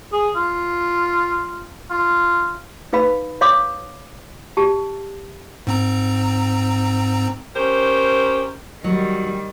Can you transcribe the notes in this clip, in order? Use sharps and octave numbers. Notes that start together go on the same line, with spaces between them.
G#4
F4
F4
D#4 B4 F5 B5
C#5 F5 C6 D6 D#6
G4 A5
G#2 C4 A#5
C#4 G4 A#4 C5
D#3 F#3 G3